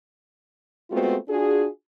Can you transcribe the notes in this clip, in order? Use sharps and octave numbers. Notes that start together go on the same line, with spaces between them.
G#3 A3 B3 C4 F4 F#4
D4 F4 F#4 G#4